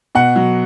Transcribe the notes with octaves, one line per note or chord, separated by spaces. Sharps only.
B2 F#5
F#3